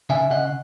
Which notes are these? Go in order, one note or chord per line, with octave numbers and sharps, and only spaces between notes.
C#3 E5 G#5
C#3 D#5 F#5